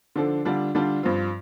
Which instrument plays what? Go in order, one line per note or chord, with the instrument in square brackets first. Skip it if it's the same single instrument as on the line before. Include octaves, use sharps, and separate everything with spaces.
[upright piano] D3 F3 D4 A4
D3 G3 D4 F4
D3 G3 D4 F4
G2 F3 C4 F4